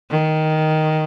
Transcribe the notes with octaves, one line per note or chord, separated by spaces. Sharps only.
D#3